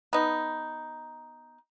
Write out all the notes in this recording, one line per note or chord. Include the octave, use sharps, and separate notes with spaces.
B3 D#4